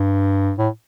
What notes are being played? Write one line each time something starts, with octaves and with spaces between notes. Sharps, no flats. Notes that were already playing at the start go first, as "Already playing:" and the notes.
Already playing: G2
A2